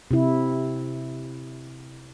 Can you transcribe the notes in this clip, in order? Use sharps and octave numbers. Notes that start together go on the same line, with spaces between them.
C3 E4